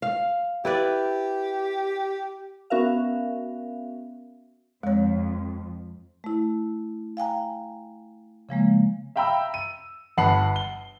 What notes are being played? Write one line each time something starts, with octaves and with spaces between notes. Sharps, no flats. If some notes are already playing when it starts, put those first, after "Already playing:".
F5
E4 G4 B4 D5
B3 C#4 F#4 A#4 E5 F5
F2 G#3 C#5
A3 E4
F5 G5 G#5 A#5
C#3 F3 G#3 A#3
E5 F5 G5 A#5 B5 E6
D#7
G1 F#5 A5 B5 C7 F#7
G7